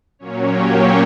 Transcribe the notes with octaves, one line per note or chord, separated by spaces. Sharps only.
A#2 F#3 A#3 C#4 C#5
G4 G5